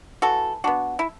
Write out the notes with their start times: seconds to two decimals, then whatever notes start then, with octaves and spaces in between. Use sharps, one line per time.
0.22 E3 F#4 A4
0.64 B3 D4 F#4
0.99 E4